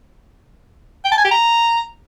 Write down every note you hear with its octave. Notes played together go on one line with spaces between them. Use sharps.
G5
A5
G#5
G4
A#5